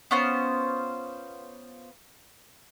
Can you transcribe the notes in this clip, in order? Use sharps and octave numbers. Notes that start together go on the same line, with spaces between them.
B3 C#4 F4 C5